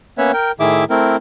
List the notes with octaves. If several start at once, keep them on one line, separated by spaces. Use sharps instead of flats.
A#3 B3 C#4 B4 C#5 E5
A#4 G5
A2 D#3 E4 G#4 E5 D6
A3 C4 E4 A#4